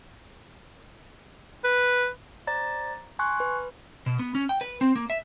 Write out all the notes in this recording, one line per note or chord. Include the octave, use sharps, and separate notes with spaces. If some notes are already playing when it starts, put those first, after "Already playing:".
B4
C5 D5 A#5 A6
G#5 C6 C#6 F#6
B4
B2
B3
C#4
G5
B4
C4
A#3
E5